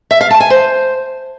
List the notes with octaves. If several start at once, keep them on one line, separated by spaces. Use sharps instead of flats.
E5
F5
A5
G#5
C5